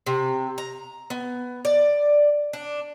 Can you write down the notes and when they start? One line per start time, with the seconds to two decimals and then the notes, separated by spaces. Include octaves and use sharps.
0.06 C3
0.58 A#5
1.10 B3
1.65 D5
2.53 D4